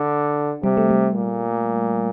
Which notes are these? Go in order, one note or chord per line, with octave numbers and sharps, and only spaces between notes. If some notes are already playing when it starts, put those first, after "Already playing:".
Already playing: D3 D4
C3 G3
A3
G3
A#2